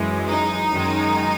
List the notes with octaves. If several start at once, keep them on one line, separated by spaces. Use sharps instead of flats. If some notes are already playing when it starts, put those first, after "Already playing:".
Already playing: F#2 E3 G#3
D#4
F#2 D#3 G#3